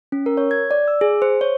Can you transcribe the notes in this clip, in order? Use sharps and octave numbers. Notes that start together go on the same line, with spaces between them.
C#4
A#4
C#5
G#6
D5
E6
G#4
C5
C#5